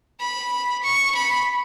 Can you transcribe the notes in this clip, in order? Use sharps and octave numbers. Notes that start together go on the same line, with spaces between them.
B5
C#6
B5